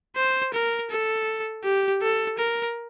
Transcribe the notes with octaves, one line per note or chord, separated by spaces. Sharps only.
C5
A#4
A4
G4
A4
A#4